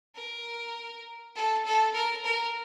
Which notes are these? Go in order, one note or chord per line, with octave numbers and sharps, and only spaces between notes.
A#4
A4
A4
A#4
A#4